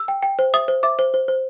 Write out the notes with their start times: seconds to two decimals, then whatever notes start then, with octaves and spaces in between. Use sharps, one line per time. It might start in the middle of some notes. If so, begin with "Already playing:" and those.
Already playing: E6
0.08 G5
0.23 G5
0.39 C5
0.54 E5 D#6
0.68 C5
0.83 E5 D6
0.99 C5
1.14 C5
1.28 C5